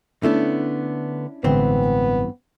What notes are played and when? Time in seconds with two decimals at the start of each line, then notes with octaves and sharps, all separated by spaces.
0.23 D3 A3 B3 C#4 D4 E4
1.44 A1 G2 D3 E3 G#3 B3 C4